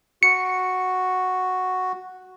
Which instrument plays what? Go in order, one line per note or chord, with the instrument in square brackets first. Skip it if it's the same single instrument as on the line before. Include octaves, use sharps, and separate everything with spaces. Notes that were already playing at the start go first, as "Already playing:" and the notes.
[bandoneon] F#4 [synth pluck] C#7